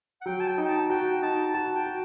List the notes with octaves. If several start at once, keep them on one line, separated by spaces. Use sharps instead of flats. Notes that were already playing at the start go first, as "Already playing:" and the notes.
F#5
F#3 G5
A5
G5
D#4
G5
A5
F#4 G5
D#4 A5
F#4 A5
G5
F#4